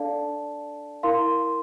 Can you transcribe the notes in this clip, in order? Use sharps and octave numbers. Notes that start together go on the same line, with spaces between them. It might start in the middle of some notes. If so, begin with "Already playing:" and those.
Already playing: D4 A4 D5 F5 A5
E4 A#4 F5 C6